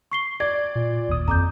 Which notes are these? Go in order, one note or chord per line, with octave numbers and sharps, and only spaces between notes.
C#6 C7 G7
D5 G#6
A#2
G#1 D#2 D#6
F2 A#5 D6 G6